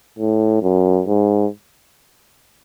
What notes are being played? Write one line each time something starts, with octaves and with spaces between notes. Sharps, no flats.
A2
F#2
G#2